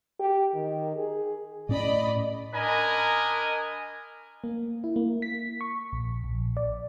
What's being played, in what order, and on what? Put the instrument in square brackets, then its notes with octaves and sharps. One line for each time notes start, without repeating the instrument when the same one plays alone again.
[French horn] G4
D#3
G#4
[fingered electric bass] A2 C#4 [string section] D5 D#5 B5
[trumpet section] D4 A#4 D#5 G#5 B5
[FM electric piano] A#3
E4
A#3
B6
C#6
A#1
A#1
D5